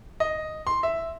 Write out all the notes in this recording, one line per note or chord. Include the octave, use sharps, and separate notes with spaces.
D#5
C6
E5